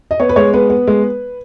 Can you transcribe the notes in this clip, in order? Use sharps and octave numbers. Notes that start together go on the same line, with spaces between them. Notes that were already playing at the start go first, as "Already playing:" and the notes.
D#5
B3 C#5
B4
G#3 C#5
B3 B4
B3
G#3